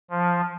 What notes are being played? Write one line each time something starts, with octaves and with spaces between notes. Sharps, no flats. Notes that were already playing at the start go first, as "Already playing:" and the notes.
F3